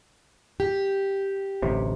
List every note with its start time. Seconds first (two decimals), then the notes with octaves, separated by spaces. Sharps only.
0.60 G4
1.62 D1 A1 C3